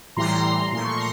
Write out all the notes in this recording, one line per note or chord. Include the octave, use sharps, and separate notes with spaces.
A2 E3 G3 A#5 C6
A#2 F3 A3 C6
C#6
A#5 C6